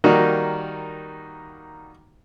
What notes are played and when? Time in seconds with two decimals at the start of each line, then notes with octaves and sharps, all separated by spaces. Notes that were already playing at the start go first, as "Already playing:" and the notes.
0.04 D#3 G3 A#3 D#4 F#4